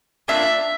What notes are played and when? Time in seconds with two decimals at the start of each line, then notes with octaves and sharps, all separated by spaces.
0.28 A#3 D4 F4 E5